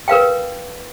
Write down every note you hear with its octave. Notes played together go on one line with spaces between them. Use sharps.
A#4 B4 F5 G5